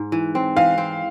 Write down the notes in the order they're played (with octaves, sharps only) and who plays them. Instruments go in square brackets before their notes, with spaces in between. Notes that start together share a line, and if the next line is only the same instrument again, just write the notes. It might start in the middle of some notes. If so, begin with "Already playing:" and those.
Already playing: [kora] G#2
E3
C4
[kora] E3 [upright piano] F5
[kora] C4